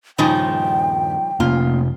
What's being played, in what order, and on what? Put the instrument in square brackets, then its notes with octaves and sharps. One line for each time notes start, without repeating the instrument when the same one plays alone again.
[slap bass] D#1 G2 [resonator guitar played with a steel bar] C#3 F3 D#4 [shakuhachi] G5
[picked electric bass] F1 [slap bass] A#3 C#4 [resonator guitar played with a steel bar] F4